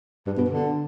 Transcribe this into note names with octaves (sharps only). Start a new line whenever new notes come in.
G2
B2
D3